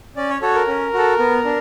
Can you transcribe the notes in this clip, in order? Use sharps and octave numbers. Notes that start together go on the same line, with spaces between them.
C#4 D5
C#5
F#4 A4 C#5
A#4
C#4
F#4 A4
B3
D4